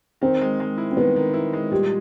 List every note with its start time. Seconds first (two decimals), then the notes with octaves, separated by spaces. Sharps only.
0.21 D#3 C4
0.41 G#3
0.60 G#3
0.78 E4
0.91 C4
0.97 D#3 B3
1.16 D#3
1.34 E4
1.53 G#3
1.71 A#2 G3